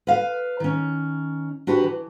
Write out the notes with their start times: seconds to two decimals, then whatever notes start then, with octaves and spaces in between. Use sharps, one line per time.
0.07 B4 F5
0.60 D#3 C#4
1.67 D4 F#4 G4 B4
1.84 E3